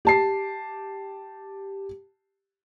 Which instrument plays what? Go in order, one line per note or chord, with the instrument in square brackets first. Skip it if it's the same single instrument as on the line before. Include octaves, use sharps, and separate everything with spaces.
[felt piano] G4 A5 C7